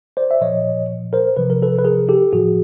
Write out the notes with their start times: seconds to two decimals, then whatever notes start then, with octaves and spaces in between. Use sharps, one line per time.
0.17 C5 D5
0.31 E5
0.41 A#2 F3 C#5 D#5
1.13 A#4 C5
1.37 C3 F3 B4
1.50 A#4
1.62 A4 B4
1.78 B4
1.85 G#4 A#4
2.08 G4 A4
2.32 A2 F3 F#4 G#4